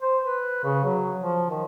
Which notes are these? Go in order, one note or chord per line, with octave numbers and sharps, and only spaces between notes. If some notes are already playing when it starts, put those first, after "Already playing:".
C5
B4
C#3
F#3
F3
D#3